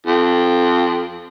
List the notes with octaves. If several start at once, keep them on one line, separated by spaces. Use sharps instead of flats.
F2